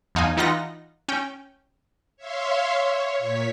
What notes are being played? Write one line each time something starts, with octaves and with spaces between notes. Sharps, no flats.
E2 D#4 F5 G#5
E3 D#4 F4 F#5 A#6
C#4 G5
C#5 E5 F5 C6
C#5
A#2 C#5 B6